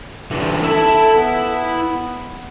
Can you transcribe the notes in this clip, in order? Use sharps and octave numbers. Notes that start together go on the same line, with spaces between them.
D3 E3 G3
E4 A4 E5
B3